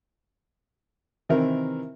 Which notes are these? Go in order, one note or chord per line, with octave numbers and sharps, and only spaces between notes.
C3 D#3 E3 C4 E4 A#4